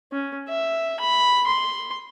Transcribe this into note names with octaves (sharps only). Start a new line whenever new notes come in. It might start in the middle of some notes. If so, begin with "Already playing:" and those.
C#4
E5
B5
C6